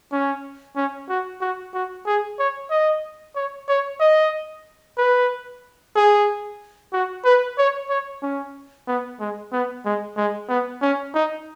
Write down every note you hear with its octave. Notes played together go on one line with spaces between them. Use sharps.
C#4
C#4
F#4
F#4
F#4
G#4
C#5
D#5
C#5
C#5
D#5
B4
G#4
F#4
B4
C#5
C#5
C#4
B3
G#3
B3
G#3
G#3
B3
C#4
D#4